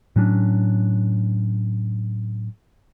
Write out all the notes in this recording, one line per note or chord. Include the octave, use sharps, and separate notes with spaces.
A2 F#3 C#4 D4